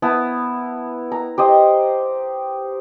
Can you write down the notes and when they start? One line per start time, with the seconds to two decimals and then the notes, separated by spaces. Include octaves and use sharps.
0.02 B3 E4 A5
1.12 A#5
1.38 G4 C5 D#5